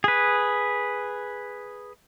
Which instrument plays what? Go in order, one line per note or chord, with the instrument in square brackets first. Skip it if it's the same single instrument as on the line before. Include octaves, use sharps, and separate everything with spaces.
[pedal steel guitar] G#4 B4